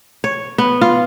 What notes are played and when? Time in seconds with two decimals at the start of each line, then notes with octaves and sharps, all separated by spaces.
0.24 C#5
0.58 B3
0.81 F4